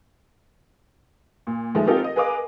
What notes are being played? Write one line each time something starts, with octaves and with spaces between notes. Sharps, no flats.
A#2
D#3 F3 G#3 A3
C4 D#4 F4 G4 A4 A#4
D#5
G#4 A#4 B4 D#5 F5 D6